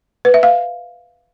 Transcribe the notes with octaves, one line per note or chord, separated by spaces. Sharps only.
B4
E5
F5